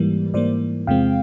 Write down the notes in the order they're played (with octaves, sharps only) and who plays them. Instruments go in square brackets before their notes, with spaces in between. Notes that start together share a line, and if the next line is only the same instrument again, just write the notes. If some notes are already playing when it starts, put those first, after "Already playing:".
Already playing: [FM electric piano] G#2 E3 G3 A#3
G#2 E3 G3 A#3 C5 D5
E2 C3 F3 G#3 C4 F5 G5